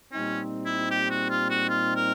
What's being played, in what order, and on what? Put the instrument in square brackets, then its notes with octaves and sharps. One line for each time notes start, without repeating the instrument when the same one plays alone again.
[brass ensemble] A#2 G3 C4 D#4 [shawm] C#4
[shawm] E4
G4
F#4
F4
F#4
F4
A#4